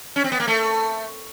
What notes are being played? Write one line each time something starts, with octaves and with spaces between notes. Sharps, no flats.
C#4
C4
B3
A#3
A3